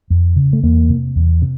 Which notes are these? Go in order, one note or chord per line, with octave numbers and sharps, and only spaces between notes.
F2
C#3
A3
E2 A#3
C3
E2
C3